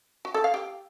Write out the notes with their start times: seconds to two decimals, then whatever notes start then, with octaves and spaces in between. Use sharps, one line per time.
0.25 F#4
0.34 A4
0.44 F5
0.54 G4